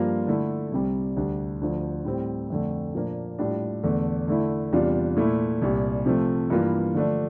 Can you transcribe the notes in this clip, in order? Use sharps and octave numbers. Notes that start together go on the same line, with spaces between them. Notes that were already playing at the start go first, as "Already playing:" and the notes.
Already playing: G2 F3 A#3 F4
D3 A3 E4
C2 C3 G3
D2 D3 G3 D4
D2 D3 F3
A2 G3 C4
F2 D3 A3
A#2 F3 A#3 D4
A2 G3 D4 F4
E2 D3 A3
D3 A3 E4
E2 C3 G3 D4 F4
A#2 A3 E4
C2 A#2 G3
C3 F3 A3
G2 E3 G3 A#3 F4
D3 F3 A3 D4